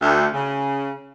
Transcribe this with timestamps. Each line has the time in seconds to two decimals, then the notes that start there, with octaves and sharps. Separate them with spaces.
0.02 D2
0.33 C#3